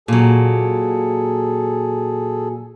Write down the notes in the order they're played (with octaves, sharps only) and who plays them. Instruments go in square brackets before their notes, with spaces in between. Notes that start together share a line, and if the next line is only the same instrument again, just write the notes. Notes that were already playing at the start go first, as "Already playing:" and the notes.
[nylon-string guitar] A#2 F#3 [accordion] G#4 A4